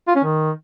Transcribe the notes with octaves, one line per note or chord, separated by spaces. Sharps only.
F4
C#4
D#3